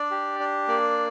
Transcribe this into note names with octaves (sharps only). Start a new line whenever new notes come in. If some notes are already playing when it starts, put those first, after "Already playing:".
Already playing: D4 D5
G4
D4
A#3 D5